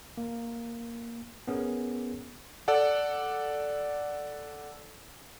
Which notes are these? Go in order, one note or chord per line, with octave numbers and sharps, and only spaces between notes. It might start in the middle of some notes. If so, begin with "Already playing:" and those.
A#3
B3 C#4 G#4 A#4
A4 D5 F#5